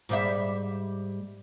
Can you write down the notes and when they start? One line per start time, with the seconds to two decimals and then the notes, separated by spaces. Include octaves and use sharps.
0.09 G#2 G3 E5